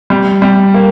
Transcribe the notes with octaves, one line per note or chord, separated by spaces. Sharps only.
G3
G3
A#3